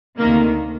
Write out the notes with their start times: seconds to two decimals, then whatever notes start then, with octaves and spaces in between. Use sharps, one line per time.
0.18 D2 C3 D#3 A#3